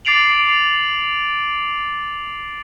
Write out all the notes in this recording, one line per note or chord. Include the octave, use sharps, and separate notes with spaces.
D6 A6 C7 D7 F7 F#7